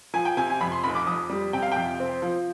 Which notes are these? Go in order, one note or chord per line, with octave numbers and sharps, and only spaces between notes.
F3 G#5
G5
C3 G#5
G#5
F2 B5
C6
F1 B5
D6
F2 D#6
G3
C3 G5
F5
F2 G5
C4
F3